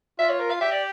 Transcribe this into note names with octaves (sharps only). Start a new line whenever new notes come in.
F4 E5
C#5
A#4
F5
G4 E5
D5